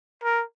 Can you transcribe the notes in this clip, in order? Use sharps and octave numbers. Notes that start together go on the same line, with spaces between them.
A#4